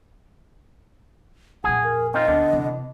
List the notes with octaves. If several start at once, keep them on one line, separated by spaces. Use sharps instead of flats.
F2 A#2 G#4 F#5
A#4
C4 D#4 F4 D#5
D2 D3 B3 D4
E2 C3